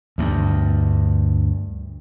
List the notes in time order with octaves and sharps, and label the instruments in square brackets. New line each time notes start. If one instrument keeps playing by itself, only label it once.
[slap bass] D2 G2